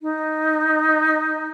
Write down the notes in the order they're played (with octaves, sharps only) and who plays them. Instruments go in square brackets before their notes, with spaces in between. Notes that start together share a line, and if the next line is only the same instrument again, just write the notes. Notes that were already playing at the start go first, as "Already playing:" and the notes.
[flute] D#4